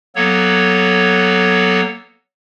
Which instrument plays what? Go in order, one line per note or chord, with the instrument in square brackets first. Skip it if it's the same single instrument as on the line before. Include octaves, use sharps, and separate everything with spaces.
[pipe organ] F#3 A#3 B3 A4 C#5